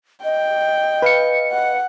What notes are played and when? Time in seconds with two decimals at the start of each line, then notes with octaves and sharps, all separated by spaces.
0.24 D#5 G5
1.02 B4 F5 C#7
1.52 F#5